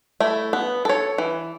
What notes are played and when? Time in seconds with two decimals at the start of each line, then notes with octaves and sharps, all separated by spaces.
0.20 A3 E4
0.53 B3
0.85 A4 C#5
1.18 E3